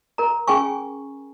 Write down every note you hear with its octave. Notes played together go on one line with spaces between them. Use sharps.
A#4 A#5
C#4 G#4 G5 G#5 C#6